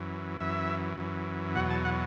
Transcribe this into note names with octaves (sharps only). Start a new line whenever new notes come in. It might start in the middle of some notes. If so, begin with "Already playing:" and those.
Already playing: F#2 E3
F#2 E3 E5
F#2 E3
E2 B2 F#3 F#5
A5
F#5